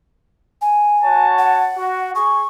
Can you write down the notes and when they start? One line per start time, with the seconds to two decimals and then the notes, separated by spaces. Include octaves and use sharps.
0.62 G#5
1.03 F#4 C#5 A5
1.38 F#5
1.77 F#4
2.15 G#4 C#6